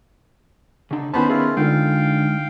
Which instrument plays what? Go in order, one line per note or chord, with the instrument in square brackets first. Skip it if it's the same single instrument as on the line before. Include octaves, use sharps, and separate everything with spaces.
[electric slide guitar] C#3 D4 [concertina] D#4
[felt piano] D#3 B3 C#4 [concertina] C5 B5 [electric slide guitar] A5
[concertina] E4 F4 [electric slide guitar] G#4 A#4
[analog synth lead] D3 [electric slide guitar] G#3 D#4 [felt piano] F4 [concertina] F5 G5